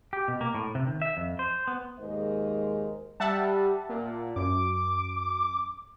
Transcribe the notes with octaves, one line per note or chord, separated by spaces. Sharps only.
G4
B2
A#3
A2
C3
D#3
E5
F2
C5
B3
D#2 G#2 G#3 A#4 C5 D#5
G3 E5 F#5 A5
A#2
F#2 D6